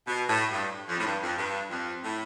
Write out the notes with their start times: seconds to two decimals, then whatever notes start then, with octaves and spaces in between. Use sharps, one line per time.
0.07 B2
0.29 A2
0.51 G2
0.89 F2
1.00 A2
1.05 G2
1.22 F2
1.38 G2
1.70 F2
2.04 A2